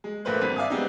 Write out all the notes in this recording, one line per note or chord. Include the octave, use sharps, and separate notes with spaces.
G#3
A#1 A3 A#3 B4 C5 F#6
G#1 G2 B6 D#7
D5 E5 F5 G#5 D6 D#6
G3 G#3 B3 C4 D4 D#4